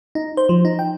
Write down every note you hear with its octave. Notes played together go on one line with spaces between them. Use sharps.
D#4
C5
F3
D#4
G5